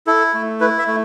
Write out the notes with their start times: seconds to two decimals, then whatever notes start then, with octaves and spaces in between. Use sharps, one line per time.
0.07 E4 A4
0.34 A3
0.60 E4 B4
0.79 E5
0.87 A3